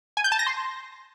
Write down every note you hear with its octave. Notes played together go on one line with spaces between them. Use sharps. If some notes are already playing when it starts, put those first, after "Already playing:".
G#5
G6
A5
A#6
C6